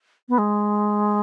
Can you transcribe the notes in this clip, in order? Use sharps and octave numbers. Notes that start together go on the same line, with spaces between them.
B3
G#3